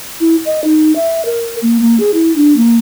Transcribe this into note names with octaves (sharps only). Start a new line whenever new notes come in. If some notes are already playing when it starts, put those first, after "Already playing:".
E4
D#5
D#4
E5
A#4
A#3
A#3
G#4
E4
D4
A#3